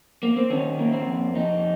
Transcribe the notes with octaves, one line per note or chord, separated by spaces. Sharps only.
A#3
C4
D#3 C#4
A#3
C4
F2
F2 D#4